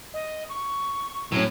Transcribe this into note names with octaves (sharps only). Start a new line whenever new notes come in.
D#5
C#6
A2 F#3 C#4